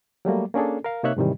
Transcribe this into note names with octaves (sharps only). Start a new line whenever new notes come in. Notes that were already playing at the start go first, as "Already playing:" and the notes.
F#3 G3 A3 A#3
A#3 C#4 D4 G#4 A4
A#4 F5
C3 A#3 D#4 C#5 E5 F#6
G#2 C3 D#3 E3 G3